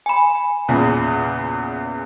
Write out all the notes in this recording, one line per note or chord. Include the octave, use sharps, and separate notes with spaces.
G#5 B5
E2 A#2 C#3